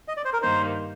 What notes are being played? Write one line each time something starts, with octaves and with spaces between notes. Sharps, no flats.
D#5
D5
C5
A#4
G2 D#3 A#3 D#4 C5